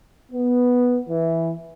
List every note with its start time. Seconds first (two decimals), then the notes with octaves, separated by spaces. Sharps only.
0.32 B3
1.09 E3